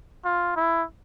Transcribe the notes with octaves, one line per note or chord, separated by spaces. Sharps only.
F4
E4